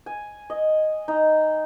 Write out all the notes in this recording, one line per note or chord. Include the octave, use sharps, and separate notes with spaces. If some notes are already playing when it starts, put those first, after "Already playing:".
G#5
D#5
D#4